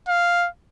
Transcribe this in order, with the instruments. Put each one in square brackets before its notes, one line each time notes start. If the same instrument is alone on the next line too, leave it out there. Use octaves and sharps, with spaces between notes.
[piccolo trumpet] F5